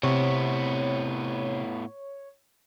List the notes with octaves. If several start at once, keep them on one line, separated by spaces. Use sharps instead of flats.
A2 C3 B3 C#5